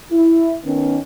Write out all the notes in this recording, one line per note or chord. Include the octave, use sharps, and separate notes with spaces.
E4
D#3 B3 C#4